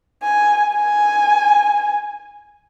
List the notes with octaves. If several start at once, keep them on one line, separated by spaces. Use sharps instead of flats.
G#5
G#5